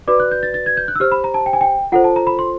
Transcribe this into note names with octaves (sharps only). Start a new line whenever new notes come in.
F#4 B4 D5 D6
F#6
G6
A6
A6
G#6
G6
F#6
E6
G4 C5 F6
B5
A#5
A5
G5
G#5
G5
F4 A4 C5 F#5
A5
A#5
B5
C6